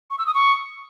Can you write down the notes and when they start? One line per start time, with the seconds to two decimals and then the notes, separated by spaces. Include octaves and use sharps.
0.11 C#6
0.18 E6
0.26 D#6
0.34 C#6